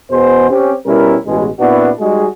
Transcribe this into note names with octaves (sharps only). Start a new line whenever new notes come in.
E2 B2 B3 G#4 C5
C4 C#4 G4
B2 G3 C#4 E4 A#4
A1 B2 G#3
A#2 B3 C4 D4 E4 F#4
G3 G#3 D#4 F#4 G#4